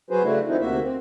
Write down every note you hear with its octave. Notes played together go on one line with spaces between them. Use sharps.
F#3 F#4 G#4 B4 C5
C#3 A3 D4 E4 F#4
D#3 F3 C4 D#4 E4
D2 C3 A#3 F#4 E5
C4